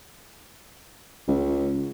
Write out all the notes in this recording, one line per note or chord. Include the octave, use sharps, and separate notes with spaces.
C#2